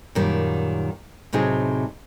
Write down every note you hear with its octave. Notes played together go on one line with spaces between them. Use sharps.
F#2 A#2 D#3 G3
A2 C3 F#3 D#4 G#4